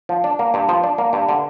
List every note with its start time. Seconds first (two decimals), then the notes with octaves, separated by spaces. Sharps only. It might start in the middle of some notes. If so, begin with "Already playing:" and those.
0.09 F3
0.24 D4
0.39 A#3
0.54 G2
0.69 F3 C5
0.83 D4
0.98 A#3
1.13 G2
1.29 D3